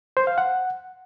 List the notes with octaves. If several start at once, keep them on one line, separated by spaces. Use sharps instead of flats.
C5
F5
F#5